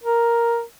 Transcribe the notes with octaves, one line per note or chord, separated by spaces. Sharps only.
A#4